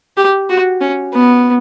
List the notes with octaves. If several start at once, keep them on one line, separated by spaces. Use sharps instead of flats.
G4
F#4
C#4
B3